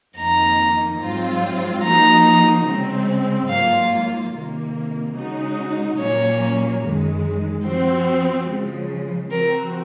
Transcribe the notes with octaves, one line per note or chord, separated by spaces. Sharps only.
F2 D#3 A#3 D#4 A#5
G#2 F#3 C4 F4
F3 A#3 D#4 F#4 A#5
C#3 G#3 C4
G#2 F#3 A#3 F4 F5
C3 D#3 A#3
C#3 G#3 D#4 F#4
A#2 F#3 A#3 C#4 C#5
F#2 D#3 G#3
F3 C4 F#4 C5
C#3 F3 G#3
F3 C4 F#4 A#4